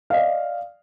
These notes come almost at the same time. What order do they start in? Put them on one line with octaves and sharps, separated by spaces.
F5 D#5 D5